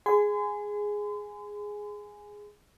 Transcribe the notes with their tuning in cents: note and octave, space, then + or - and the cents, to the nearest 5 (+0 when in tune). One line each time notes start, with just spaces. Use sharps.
G#4 +0 G#5 +0 C6 -40